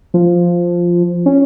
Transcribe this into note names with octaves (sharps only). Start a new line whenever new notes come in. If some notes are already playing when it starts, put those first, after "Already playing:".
F3
C#4